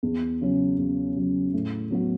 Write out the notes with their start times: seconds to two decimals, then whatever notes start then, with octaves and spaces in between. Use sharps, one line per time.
0.03 E2
0.41 C#3 F#3 C#4
0.78 E2
1.16 C#3 F#3 C#4
1.53 A2
1.91 F#3 B3 F#4